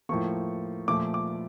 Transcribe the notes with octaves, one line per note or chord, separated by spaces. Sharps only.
A2 F3 A#3 C#6
A#2 F3 A3 D6
D6